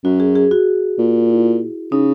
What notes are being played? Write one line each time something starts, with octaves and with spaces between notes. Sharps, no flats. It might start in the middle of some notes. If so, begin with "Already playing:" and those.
F#2 F#4
G#4
G#4
F#4
A#2
E4
C#3 D#4